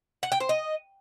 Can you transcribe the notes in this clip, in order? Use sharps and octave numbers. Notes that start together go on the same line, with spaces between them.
F#5
G5
C5
D#5